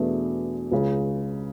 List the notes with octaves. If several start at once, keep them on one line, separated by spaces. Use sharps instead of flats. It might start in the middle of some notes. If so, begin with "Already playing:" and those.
Already playing: E2 B2 A3 D4 G#4
C#2 C#3 G#3